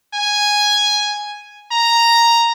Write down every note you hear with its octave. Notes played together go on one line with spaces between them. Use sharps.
G#5
A#5